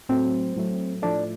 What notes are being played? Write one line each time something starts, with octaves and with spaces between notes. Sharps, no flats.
A2 F#3 A3 C4
A2 F#3 A3
A2 F3 A3 D4